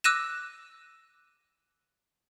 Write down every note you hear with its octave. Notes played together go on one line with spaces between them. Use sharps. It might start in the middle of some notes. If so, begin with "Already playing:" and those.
D6 E6 F#6 A#6 D#7 E7